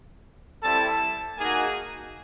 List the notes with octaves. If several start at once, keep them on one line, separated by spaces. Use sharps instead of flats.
G3 C4 E4 A4 A5
A#3 D#4 F#4 G#4 G#5